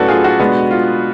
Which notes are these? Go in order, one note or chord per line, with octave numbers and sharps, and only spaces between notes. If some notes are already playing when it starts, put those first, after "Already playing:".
Already playing: A2 F#3 C#4 F#4 A4 B4 D5
F4 G#4
F#4
B2 G#3 B3 D4
F4